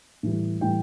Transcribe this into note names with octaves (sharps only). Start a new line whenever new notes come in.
A2 E3 G3
A2 E3 G3 G5